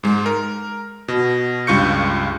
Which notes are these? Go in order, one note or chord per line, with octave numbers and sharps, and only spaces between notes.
G#2 G#3
A#4
B2
C#2 G2 F4 C#6 G6 C#7